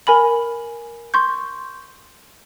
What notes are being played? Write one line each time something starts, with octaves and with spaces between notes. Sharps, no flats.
A#4 G#5 B5 F#7
C6 C#6 G6